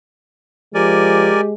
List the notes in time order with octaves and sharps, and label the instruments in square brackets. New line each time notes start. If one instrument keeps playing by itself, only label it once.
[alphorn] F3 [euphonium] G#3 [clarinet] G4 [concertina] A#4 D5 G#5